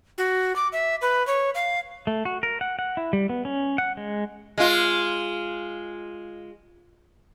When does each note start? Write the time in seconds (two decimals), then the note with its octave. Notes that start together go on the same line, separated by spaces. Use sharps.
0.18 F#4
0.56 D6
0.72 E5
1.02 B4
1.27 C#5
1.55 F5
2.07 A3
2.25 F#4
2.43 A#4
2.61 F#5
2.79 F#5
2.97 E4
3.13 G3
3.29 B3
3.45 C#4
3.78 F#5
3.97 G#3
4.58 G#3 F4